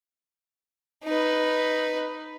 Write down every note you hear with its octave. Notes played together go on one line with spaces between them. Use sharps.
D#4 B4